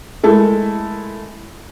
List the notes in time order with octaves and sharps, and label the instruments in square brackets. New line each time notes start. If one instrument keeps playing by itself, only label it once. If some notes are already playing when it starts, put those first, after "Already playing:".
[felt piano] G#3 A3 E4 A4 A#4